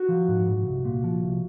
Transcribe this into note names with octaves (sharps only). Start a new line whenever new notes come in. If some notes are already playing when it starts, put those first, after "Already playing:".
Already playing: F#4
F3
G#2
G#2
C2
A#2
F3
C2